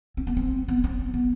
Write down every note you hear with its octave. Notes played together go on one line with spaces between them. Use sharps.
C4
B3
C4
B3
C4
C4
B3